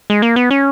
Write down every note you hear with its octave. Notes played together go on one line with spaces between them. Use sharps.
G#3
A#3
B3
C#4